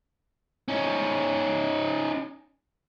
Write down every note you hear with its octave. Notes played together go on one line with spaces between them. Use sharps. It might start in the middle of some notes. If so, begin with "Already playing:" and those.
C#4 D#4